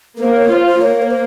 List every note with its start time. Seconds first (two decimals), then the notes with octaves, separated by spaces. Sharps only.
0.17 A#4
0.22 A#3 C5
0.36 C#5
0.52 F4 C5
0.67 C5
0.81 A#3 C#5
1.02 A#4
1.10 C5